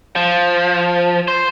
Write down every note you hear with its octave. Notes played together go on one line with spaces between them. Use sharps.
F3
C5